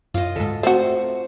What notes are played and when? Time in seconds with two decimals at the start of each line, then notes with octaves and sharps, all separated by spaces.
0.14 F#2 F4 D#5
0.36 D2 G#2 A4
0.63 A3 C4 F#4 A4 C5